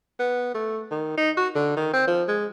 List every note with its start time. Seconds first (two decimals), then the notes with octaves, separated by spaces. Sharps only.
0.20 B3
0.55 A3
0.91 D#3
1.17 D#4
1.37 F#4
1.55 D3
1.77 D#3
1.93 C4
2.07 F3
2.28 G#3